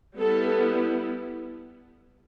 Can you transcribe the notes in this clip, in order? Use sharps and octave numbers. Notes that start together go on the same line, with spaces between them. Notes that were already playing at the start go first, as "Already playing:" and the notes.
G3 B3 E4 A4